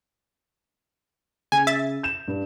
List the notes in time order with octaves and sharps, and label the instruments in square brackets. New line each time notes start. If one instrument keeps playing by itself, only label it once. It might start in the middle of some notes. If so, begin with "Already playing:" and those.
[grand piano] C#3 [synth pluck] G#5
[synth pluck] E5 A6
[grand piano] G6 E7
G2